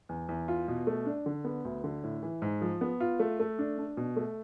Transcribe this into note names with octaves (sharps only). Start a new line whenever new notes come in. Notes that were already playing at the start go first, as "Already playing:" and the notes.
E2
E2
F4
B2
A3
D4
D3
B3
D2
D3
A2
E3
G#2
F3
B3
F4
A3
A3
D4
D4
B2
A3